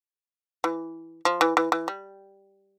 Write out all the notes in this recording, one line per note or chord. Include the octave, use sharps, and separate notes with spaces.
E3
F3
E3
E3
E3
G3